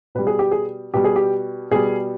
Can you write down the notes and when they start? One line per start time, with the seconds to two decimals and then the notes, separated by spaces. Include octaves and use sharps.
0.15 B2 G3 B4
0.27 G#4
0.39 G4
0.51 G#4
0.94 B2 G3 G4
1.04 G#4
1.16 G4
1.71 B2 G3 G#4